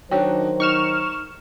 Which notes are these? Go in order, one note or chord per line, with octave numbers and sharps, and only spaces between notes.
D#3 F#3 D4 D#4 F#4 C5 C#5 G5
D#4 C#6 F6 E7